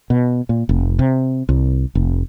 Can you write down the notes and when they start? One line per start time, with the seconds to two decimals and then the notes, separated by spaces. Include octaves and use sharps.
0.10 B2
0.49 A#2
0.69 F1
0.99 C3
1.49 C2
1.95 F1